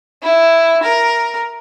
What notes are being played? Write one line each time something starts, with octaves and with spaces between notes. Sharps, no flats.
E4
A#4